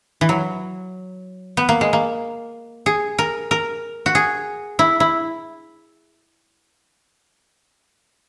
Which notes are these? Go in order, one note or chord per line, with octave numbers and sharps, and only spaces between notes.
E3
F#3
B3
A#3
G#3
A#3
G#4
A#4
A#4
F#4
G#4
E4
E4